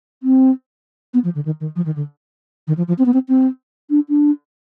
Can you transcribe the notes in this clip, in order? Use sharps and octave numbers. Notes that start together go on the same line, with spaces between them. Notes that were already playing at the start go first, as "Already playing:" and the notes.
C4
B3
F3
D3
D#3
D#3
F3
D#3
D3
D#3
F3
F3
C4
B3
C4
C4
D4
D4